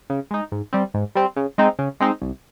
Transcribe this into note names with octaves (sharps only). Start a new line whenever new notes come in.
C#3
G#3 D#4
G#2
G3 C4
G#2
G3 C4
C#3
G#3 C4 D#4
C#3
G#3 C4 D#4
C2